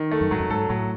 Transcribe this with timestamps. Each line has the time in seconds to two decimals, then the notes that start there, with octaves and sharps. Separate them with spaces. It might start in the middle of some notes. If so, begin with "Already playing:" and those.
Already playing: D#3
0.11 A3
0.21 F#2
0.31 G#2 F#3
0.40 F#2
0.50 G#2 A4
0.69 A2 F#3